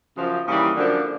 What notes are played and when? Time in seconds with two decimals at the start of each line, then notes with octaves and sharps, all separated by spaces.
0.16 F#2 C#3 F3
0.46 D#2 C#3 E3 G3
0.77 F#2 D3 F3 A#3 D4